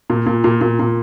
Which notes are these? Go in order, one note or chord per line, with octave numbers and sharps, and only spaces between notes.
A#2
A#2
A#2
A#2
A#2